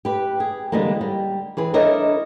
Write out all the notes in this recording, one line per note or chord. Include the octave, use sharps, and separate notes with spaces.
G4 B4
G#4
D3 E3 G3 G#3 A#3
G3
E3 G#4 B4
D4 E4 A4 A#4 C#5 D#5